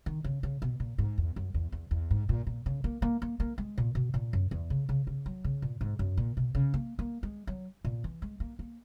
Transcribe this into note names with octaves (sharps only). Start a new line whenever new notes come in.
D#3
C#3
C#3
B2
A#2
G#2
E2
F#2
E2
E2
E2
G#2
A#2
A#2
C#3
A#3
A#3
A#3
A#3
G#3
A#2
B2
A#2
F#2
E2
C#3
C#3
C#3
F#3
C#3
A#2
G#2
F#2
A#2
B2
C#3
A#3
A#3
G#3
F#3
A#2
E3
G#3
A#3
A#3